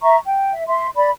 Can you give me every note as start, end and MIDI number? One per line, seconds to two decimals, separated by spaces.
0.02 0.18 76
0.02 0.18 82
0.02 0.18 85
0.25 0.52 79
0.53 0.65 76
0.68 0.87 76
0.68 0.87 84
0.95 1.09 74
0.95 1.09 83